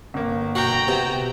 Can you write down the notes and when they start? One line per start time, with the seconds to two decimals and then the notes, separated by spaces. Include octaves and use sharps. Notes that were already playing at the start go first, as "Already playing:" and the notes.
0.14 G1 A#3
0.55 B2 F#4 G5 A#5
0.88 C3 B3